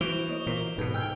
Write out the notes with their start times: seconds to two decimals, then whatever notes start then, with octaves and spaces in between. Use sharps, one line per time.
0.01 E3 F#4 C5 D7 F7 G7
0.29 A#3 C#5 D#5
0.46 A#2 E3 A#4
0.78 G#2 B2 A4 B4
0.94 G5 G#5 E6 F6 G6